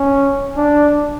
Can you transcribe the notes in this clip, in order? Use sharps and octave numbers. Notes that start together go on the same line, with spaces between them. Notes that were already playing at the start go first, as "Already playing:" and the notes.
Already playing: C#4
D4